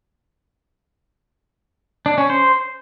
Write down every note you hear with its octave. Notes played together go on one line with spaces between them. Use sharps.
D4
C#4
C5